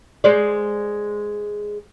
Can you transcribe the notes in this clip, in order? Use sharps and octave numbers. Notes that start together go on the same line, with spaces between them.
G#3 C5 D5